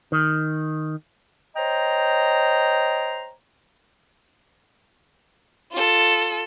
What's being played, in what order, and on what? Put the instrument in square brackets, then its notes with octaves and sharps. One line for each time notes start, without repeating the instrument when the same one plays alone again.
[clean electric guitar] D#3
[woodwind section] C5 C#5 D#5 G5 A#5
[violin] F4 A4